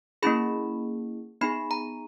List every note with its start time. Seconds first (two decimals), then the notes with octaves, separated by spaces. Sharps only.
0.23 A#3 C#4 E4 G#4 B5
1.41 B3 D#4 G#4 B5
1.71 A#5